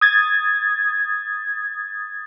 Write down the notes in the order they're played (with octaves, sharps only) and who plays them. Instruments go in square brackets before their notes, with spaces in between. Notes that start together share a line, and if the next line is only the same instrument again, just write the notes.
[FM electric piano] D#6 G#6 A6